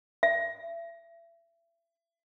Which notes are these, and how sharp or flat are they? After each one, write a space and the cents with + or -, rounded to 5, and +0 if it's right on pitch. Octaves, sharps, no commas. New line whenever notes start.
E5 +30